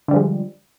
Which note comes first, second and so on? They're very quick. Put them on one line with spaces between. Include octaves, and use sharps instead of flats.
D3 G3 F3 G#3